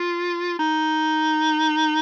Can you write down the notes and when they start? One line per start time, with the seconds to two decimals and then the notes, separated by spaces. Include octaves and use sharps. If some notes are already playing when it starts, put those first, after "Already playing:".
Already playing: F4
0.59 D#4